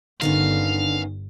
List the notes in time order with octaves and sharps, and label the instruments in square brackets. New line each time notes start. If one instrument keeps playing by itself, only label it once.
[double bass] G1 [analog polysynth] D3 [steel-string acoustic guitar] D#3 B3 C#4 [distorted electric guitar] F5